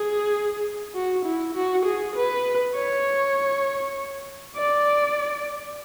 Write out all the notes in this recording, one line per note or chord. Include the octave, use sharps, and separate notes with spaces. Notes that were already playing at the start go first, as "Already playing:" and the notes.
Already playing: G#4
F#4
E4
F#4
G#4
B4
C#5
D5